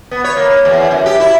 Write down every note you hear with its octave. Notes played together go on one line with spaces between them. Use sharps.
B3
C#5
A#3
E2
F#2
G4
E4